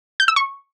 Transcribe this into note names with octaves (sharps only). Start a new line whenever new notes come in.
G6
E6
C#6